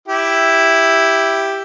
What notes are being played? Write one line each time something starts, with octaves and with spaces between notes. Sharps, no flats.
E4 G4